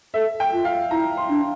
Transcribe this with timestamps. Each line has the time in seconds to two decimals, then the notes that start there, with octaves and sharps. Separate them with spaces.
0.14 A4 E5
0.40 G5
0.53 F4
0.65 F5
0.91 E4 A#5
1.17 C6
1.29 D4